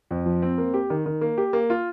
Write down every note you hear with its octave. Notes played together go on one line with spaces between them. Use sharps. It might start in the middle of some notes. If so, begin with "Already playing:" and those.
F2
F3
C4
A#3
G4
D#3
D#3
A#3
G4
A#3
F4